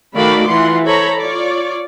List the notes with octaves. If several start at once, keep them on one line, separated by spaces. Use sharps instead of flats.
D#3 A3 F#4 D5 F5 B5
E3 F4 F#5 C6
A4 C5 C#5 A#5 B5
F4 C#5 D5